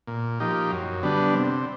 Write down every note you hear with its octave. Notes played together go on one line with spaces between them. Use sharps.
A#2
F3 A#3 D#4 G4
F#2
D3 G3 B3 D4
C3